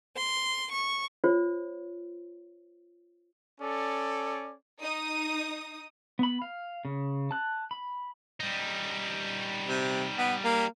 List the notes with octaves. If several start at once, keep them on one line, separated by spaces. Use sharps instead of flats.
C6
C#6
F4 C5 C#5
C#4 A4 D5
D#4 D#6
B3 B5
F5
C#3
A5 F#6
B5
G3 D#4
C3
B3
A#3